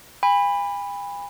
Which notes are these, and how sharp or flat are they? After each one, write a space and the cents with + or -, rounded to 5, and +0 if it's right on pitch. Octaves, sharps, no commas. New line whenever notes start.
G#5 -45 B5 +0